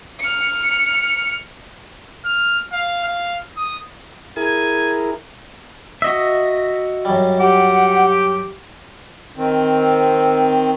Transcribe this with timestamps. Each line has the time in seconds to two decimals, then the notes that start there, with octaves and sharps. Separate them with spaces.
0.20 F6 C#7
2.26 F6
2.73 F5
3.04 F5
3.57 D#6
4.37 E4 G#4 A#4 G#5
6.02 F#4 D#5 E5
7.05 F#2 G3
7.39 G4 F#5
9.37 D#3 C4